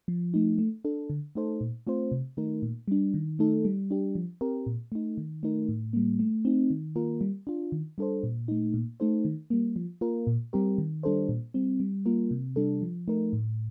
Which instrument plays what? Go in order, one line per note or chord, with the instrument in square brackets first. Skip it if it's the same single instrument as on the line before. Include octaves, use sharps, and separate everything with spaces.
[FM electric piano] F3
A3 D#4
A3
D4 A4
D3
A3 D#4 A4 C5
A#2
A3 C4 F4 C5
C3
D#3 A3 D#4 A#4
A#2
G3 D4
D#3
A3 D#4 A4
G3
D4 G4
F3
C4 G4 A#4
A#2
A3 D#4
D#3
A3 D#4 A#4
A2
G3 A#3
A3
C4 D#4
D#3
A#3 F4 A#4
G3
D4 F4
D#3
G3 D4 A4 C5
A#2
A3 D#4
A#2
A3 D#4 A4 C5
D#3
G3 A#3
F3
A#3 F4 A#4
A#2
G3 C4 G4 A#4
D#3
G3 D4 A4 C5
A#2
G3 C4
G3
A#3 F4 A#4
C3
G3 D4 A4
F3
A3 D#4 A#4
A2